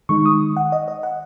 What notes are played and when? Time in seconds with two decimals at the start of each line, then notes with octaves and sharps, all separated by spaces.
0.09 D#3 G#3 D#4 C#6
0.26 D#6
0.57 F#5
0.72 D#5
0.88 D#5
1.03 F#5